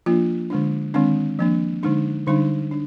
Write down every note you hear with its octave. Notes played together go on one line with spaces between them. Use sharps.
F3 A#3 D4 F4
D3 G#3 D4
D#3 G#3 C4 D4
F3 A#3 D4
D3 G#3 D4 D#4
D3 G3 D4 D#4
D4